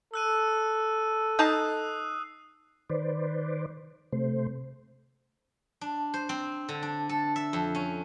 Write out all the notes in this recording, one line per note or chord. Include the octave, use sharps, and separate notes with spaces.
A4 E6 F#6 D#7
D#4 A5 D#6 F#6 C7
D#3 B4 C5 D5
C3 A3 C5
D4
C5
C4
D3
D4
A4
E5
F2
C#4